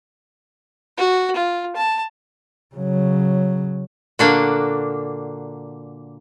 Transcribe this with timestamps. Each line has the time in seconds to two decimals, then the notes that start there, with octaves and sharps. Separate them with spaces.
0.98 F#4
1.36 F4
1.76 A5
2.75 C#3 F#3
4.19 A#2 D3 A#3 D4 F#4